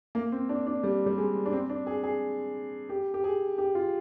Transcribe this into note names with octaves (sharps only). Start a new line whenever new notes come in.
A#3
C4
D4
D4
G3
G3
G#3
D4
C4
D4
G#4
G#4
G4
G4
G#4
G4
F4